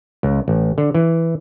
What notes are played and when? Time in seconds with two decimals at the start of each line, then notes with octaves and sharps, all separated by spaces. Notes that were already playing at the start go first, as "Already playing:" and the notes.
0.23 C#2
0.48 A1
0.78 D3
0.94 E3